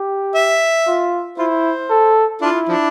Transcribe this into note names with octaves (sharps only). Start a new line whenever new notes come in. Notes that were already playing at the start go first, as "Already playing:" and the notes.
Already playing: G4
E5
F4
E4 F4 C5
A4
D4 E4 F4
F3 D4